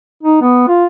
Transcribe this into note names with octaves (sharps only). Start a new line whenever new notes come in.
D#4
B3
F4